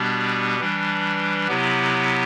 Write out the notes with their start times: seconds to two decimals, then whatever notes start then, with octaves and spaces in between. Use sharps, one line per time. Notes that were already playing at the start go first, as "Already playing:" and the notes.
Already playing: B2 G3 B3 D4 G4
0.60 E3 G3 D4
1.48 C3 F#3 B3 E4 G4